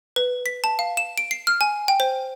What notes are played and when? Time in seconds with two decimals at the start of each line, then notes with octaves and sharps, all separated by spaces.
0.16 B4
0.46 B6
0.64 A5
0.79 F5
0.97 E7
1.18 D7
1.31 C7
1.47 F6
1.61 G#5
1.88 G5
2.00 C5